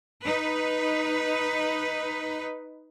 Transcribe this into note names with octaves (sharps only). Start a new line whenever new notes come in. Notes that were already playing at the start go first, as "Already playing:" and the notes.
D#4 B4